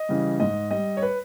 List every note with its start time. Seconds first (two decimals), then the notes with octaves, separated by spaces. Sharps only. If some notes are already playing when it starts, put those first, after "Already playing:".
Already playing: D#5
0.09 C#3 E3 G3
0.40 G#2 D#5
0.71 G3 D#5
0.97 C#5
1.02 B4